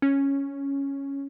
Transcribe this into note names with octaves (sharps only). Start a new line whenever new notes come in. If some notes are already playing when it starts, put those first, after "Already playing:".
C#4